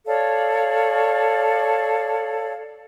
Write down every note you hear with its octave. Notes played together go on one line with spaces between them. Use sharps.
A4 C#5 D5 F5